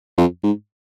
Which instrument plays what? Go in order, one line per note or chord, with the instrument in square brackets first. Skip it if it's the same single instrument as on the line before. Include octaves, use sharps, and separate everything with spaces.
[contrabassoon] F2
G#2